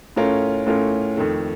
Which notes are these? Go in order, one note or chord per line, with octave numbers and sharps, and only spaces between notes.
A2 A3 C#4 F4 A#4
A2 A3 C#4 F4 A#4
F2 D#3 A3